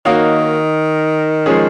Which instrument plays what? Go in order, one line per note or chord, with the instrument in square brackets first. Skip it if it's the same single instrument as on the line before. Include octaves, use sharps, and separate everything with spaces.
[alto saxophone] D#3 [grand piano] A#3 D#4 F#4 C#5 F5
[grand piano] F3 G#3 C#4 G#4